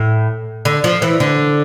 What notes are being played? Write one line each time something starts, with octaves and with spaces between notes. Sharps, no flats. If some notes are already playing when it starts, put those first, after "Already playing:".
Already playing: A2
D3
F3
E3
D3